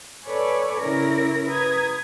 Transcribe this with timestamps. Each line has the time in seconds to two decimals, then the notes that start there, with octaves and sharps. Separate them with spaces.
0.25 A4 B4 C#5 D5 G#5
0.79 C#3 E4 A#4 A#6
1.46 B4 A#5 D#6 G#6